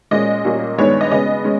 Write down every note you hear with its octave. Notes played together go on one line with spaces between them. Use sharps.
A#2 G#3 C#4 D#5
A#2 G3 A#3 C#4
G2 D#3 G#3 B3 C#5
D#5
C#3 G#3 B3 D#5
G#3 C#4